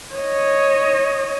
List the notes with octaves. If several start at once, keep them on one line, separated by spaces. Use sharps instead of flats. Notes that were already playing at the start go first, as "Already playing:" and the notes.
C#5 D#5